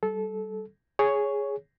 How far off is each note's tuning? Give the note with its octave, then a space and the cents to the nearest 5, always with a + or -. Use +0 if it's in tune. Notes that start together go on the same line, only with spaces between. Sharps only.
G3 -20 A4 -20
G#4 +0 C#5 +5